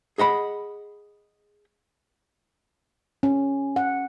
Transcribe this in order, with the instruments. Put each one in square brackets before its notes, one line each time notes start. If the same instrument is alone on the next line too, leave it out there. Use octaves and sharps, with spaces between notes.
[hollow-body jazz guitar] G#4 D#5 F#5 B5
[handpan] C#4
F#5